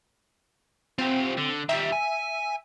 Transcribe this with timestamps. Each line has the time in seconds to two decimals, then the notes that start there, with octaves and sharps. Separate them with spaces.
0.99 C4 F4 G4
1.38 D3
1.69 D#3 G3 E5
1.92 G#5